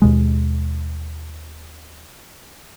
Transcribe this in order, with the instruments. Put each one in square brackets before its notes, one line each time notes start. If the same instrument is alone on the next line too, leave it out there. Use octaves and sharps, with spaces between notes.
[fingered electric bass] D#2 B2 G#3